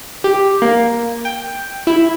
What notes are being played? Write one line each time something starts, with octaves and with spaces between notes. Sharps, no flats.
G4
A#3
G5
E4